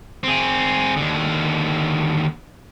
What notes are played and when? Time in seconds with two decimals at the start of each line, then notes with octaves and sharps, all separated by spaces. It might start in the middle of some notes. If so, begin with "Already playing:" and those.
0.23 C4 G#4
0.97 D#2 D3